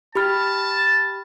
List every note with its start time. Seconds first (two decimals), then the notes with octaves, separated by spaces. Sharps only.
0.15 G4 A5 B5 F6